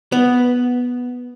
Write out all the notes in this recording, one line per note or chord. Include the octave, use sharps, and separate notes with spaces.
B3